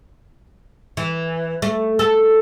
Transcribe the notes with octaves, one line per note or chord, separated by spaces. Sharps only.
E3
A3
A4